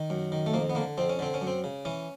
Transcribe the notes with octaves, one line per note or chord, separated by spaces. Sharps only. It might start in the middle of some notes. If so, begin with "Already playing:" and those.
Already playing: D#3
F#2
D#3
A3
F2 A#3
B3
D3 A#3
F2 C4
C#4
D3 C4
C#4
F#2
C4
C#3
E3 C#4